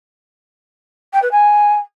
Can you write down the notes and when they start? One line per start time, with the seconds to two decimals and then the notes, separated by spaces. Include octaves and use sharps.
1.13 G5
1.22 B4
1.31 G#5